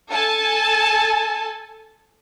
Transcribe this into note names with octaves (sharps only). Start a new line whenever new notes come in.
A4 G#5 A5